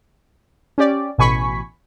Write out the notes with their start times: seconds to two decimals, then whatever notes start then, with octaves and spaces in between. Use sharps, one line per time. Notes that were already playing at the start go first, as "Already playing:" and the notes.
0.78 C#4 G4 D5
1.18 A1 B2 G#5 B5 C#6 B6